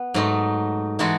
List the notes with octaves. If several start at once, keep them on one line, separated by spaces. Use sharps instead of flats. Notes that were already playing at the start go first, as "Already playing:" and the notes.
Already playing: B3
G#2 F#3 A3 D#4
E3 G#3 D#4 F#4 A4